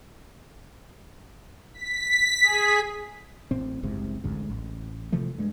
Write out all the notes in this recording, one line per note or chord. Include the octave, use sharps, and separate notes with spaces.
B6
G#4
A1 A2 C4
F#1 C2 G#2 C3
A1 D2 G#2
A1
C3 E3 F3 A3
G2 G#3